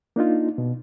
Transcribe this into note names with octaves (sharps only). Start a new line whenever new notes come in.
A#3 D4 D#4 F4
B2